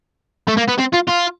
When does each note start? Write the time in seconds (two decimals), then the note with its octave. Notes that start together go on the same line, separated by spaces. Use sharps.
0.49 A3
0.58 A#3
0.69 B3
0.79 C4
0.94 F4
1.09 F4